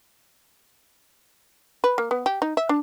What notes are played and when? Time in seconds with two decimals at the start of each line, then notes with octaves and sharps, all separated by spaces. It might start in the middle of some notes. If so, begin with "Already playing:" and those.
1.84 B4
1.98 A#3
2.11 B3
2.26 G4
2.42 D#4
2.57 E5
2.69 D4